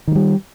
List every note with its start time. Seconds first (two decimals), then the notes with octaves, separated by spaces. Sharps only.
0.08 D#3
0.11 G#3
0.15 G3